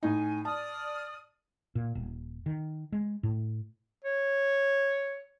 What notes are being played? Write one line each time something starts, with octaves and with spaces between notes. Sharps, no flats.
A2 D#4 G#5
D5 A5 D#6 F6
A#2
D#1
D#3
G#3
A2
C#5